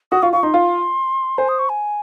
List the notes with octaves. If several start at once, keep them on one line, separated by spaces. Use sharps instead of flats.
F#4 D#6
F4 C#6
F4 C#6
D#4 C6
F4
C5 G#5
D#6
C#6
G#5